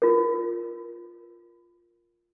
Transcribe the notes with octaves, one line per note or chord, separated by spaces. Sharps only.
F4 A#4